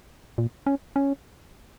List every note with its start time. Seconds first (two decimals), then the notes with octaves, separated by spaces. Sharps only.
0.38 A#2
0.66 C#4
0.96 C#4